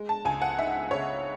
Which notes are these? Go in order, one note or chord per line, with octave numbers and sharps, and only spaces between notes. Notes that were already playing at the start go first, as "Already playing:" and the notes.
Already playing: G#3
A5
C#2 G#5
F#5
D#4 E5
C#3 C#5